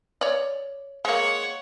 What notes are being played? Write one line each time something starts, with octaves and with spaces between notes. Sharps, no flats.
C#5 D5
G#3 A#3 C#5 F#5